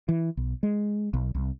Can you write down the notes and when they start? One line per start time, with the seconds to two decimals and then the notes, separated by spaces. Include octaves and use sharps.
0.09 E3
0.37 B1
0.63 G#3
1.13 B1
1.35 C2